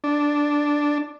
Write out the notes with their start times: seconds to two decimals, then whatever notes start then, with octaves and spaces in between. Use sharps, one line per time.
0.04 D4